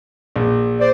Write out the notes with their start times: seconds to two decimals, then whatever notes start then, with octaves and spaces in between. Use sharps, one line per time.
0.36 A#1
0.79 C5 D5